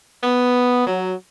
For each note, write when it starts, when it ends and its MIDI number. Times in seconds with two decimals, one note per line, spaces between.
0.23 0.86 59
0.86 1.13 54